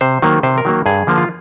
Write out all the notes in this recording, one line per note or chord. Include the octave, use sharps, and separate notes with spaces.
C3 C5
D#3 F#3 A#3
C3 C5
A#4
D#3 F#3 A#3
G2 G#4
D3 F3 A#3
F4